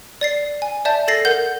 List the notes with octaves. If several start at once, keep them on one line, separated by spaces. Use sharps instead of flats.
D5 A6 C7
G#5
D5 E5 A5 G6
A4 A6 A#6 C7
A#4 F#5 G6